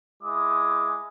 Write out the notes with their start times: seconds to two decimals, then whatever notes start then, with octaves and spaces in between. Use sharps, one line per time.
0.22 G#3 E4 D6 D#6